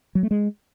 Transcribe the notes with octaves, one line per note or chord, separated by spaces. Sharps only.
F#3
A3
G#3